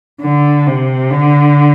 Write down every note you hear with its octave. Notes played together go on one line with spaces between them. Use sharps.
D3
C3
D3